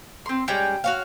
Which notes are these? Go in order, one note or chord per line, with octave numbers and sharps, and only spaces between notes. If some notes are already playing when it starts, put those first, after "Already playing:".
C4 C6
G3 G#3 C#4 G5
F#4 C#5 F5